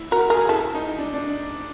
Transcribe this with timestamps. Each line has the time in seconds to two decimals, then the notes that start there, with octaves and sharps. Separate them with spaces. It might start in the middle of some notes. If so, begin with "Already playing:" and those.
Already playing: E4
0.11 F#4 A#4
0.30 G#4 A#4
0.49 E4 A4
0.75 D#4
0.98 D4
1.14 D4